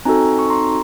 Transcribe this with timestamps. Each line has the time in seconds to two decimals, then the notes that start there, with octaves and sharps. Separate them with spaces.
0.05 C4 D#4 F#4 A4 G#5 A#5
0.39 C#6
0.50 A#5 C6